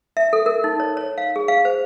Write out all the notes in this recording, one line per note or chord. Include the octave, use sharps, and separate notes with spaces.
E5
A4
A#4
D#4
C#5
C#5
F5
G#4
F5
C5